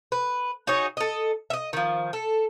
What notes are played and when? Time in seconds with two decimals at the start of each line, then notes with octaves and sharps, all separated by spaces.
0.12 B4
0.67 D#4 F#4 G#4 C#5
0.97 A4 D#5
1.50 D#5 E5
1.73 D#3 F3
2.13 A4